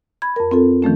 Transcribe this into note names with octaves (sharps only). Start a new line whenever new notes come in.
B5 G#6
F2 A#4
C4 F4 A4
D#3 F3 A3 C#4